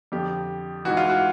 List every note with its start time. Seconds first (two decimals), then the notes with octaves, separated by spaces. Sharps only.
0.12 F2 D3 F3 G4
0.85 G#2 E3 F#4
0.97 F4
1.10 F#4